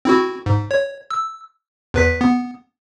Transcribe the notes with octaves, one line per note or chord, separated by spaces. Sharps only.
C4 E4 F#4
G#2
C#5
E6
E2 B4 B6
B3